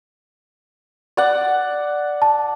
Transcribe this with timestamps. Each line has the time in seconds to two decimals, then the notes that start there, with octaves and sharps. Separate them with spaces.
1.17 D5 F#5
2.22 A5